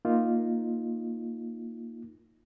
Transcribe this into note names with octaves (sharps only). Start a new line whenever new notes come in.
A#3 D#4 F4